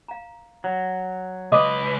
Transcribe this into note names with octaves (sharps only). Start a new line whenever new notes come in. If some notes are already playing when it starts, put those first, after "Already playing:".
F5 A#5
F#3
C#2 B4 D#5 F5 C6 D6